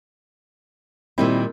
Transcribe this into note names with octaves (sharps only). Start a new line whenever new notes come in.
A#2 D#3 G3 C4 E4